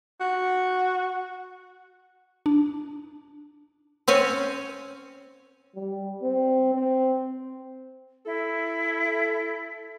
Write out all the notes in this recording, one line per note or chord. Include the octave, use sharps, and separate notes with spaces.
F#4
D4
C4 C#4 C#5 G#5
G3
C4
C4
E4 A4